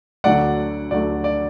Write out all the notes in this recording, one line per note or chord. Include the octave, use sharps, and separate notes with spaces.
D2 D3 F#3 A3 D5 F#5
D2 D3 F#3 A3 D5
D5